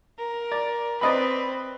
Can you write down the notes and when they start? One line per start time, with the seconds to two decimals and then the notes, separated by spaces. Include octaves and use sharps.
0.19 A#4
0.52 D5
1.01 C4 B4 D5 D#5 B5